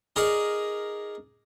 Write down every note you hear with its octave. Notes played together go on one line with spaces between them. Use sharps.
D#4 G#4 A#4 D5